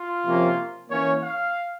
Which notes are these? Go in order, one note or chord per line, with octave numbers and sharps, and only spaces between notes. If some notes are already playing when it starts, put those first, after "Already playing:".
Already playing: F4
C3 F3 A#3 C#4
E3 A#3 C#4 C#5
F5